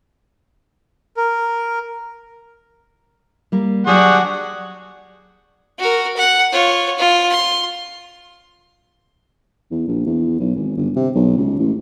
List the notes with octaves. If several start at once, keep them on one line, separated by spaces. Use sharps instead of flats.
A#4
G3 A#3
F#3 D4 G4 G#4 F#5 C#6
F#4 A#4
F#5
F4 C#5
F4
C6
E2
A#1
E2
B1
G#1
G1
C3
B1
C#2
A1